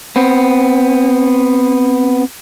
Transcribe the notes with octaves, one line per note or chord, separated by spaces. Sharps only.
B3 C4